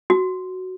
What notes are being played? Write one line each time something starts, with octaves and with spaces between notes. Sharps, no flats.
F#4